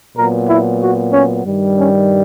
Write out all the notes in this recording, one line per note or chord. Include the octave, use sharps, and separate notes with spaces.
A#2 F#3 B3 A#4
E4
F#4
C#4
G2 D#3 G3
C#4